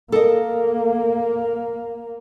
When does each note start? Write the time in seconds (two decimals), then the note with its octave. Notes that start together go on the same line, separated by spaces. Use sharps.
0.12 A#3 A4 A#4 D#5